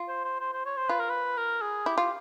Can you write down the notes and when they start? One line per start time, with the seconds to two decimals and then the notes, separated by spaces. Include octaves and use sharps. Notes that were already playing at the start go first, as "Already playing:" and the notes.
Already playing: F4
0.08 C5
0.24 C5
0.40 C5
0.53 C5
0.66 C#5
0.77 C5
0.89 F4 B4
0.99 A#4
1.09 B4
1.37 A#4
1.61 G#4
1.86 E4 G4
1.98 F4